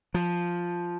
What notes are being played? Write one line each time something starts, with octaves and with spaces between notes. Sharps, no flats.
F3